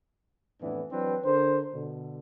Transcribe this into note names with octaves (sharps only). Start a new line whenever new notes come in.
F2 A2 E3 B3 D4
E3 F#3 C4 D4 B4
D3 D4 A#4 C5
B2 D3